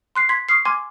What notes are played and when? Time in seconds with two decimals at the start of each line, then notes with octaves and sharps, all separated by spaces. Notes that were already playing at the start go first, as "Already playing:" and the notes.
0.15 C6 F#6 C7
0.29 C6 G#6 B6
0.49 C#6 D#6 F6 C7
0.65 G#5 C6 D6 F6 G#6